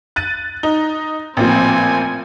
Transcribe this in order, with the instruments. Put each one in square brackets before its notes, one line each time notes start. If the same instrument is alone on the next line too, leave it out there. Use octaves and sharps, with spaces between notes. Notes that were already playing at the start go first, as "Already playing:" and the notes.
[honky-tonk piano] F#6 A6 D#7
D#4
[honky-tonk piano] A1 A#2 F3 [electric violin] C4 G#5